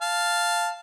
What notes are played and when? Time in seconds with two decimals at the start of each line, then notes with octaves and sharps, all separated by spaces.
0.02 F5 A5